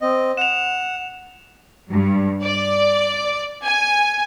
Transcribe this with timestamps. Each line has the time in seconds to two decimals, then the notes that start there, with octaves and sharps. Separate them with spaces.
0.01 C4 D#5
0.37 F#5 E7 F7
1.92 G2
2.43 D5
3.64 G#5